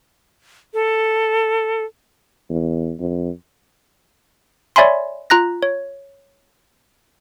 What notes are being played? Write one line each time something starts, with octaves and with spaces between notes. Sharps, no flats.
A4
E2
F2
C#5 D5 E5 G#5 B5 C6
F4 A#5 F#6 A#6
C#5